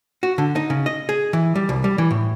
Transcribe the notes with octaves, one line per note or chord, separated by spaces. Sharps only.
F#4
D3
D#4
C#3
D#5
G#4
E3
G3
C2
G3
E3
A2